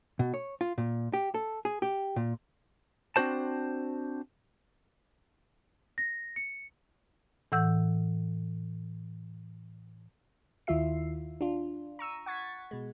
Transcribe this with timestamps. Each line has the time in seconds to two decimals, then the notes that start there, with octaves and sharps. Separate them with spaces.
0.19 B2
0.34 C#5
0.61 F4
0.78 A#2
1.14 G4
1.34 A4
1.65 G#4
1.82 G4
2.16 A#2
3.16 C4 D4 F#4 C5 A5
5.98 A#6
6.36 C#7
7.52 A2 E3 F#5 E6 G6
10.67 D#2 D#3 E4 F4 E5 C7
11.41 D4 F4
11.99 A#5 C#6 E6 D#7
12.26 F#5 C#6 G#6 A6 B6
12.71 B2 G#3